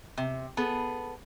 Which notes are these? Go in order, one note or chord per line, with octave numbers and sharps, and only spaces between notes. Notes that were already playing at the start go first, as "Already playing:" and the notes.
C3
B3 G#4 A4